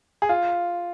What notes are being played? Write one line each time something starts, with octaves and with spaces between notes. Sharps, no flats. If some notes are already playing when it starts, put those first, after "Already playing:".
G#4
F4